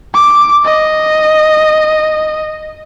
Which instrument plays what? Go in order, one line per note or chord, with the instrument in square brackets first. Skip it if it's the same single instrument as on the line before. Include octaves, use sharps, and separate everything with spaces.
[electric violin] D6
D#5